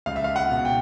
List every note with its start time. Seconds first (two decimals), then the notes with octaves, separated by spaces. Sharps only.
0.06 C#2 F5
0.16 E5
0.24 F5
0.36 F#5
0.50 B2
0.65 G5